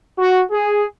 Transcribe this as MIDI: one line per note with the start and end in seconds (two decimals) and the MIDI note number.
0.19 0.42 66
0.51 0.85 68